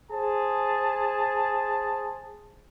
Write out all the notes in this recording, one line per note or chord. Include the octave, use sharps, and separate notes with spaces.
G#4 C5 A5